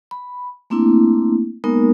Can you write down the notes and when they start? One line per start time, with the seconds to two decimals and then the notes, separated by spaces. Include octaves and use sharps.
0.11 B5
0.70 A3 A#3 C4 D4 E4
1.64 G#3 A#3 B3 D#4 A#4